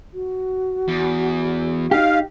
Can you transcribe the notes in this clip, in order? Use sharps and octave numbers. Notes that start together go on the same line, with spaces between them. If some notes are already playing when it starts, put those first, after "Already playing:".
F#4
E2
D#4 G4 F5